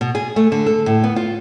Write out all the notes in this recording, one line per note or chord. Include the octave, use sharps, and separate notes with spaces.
B2
G#4
A3
D3
A4
A2
B3
F4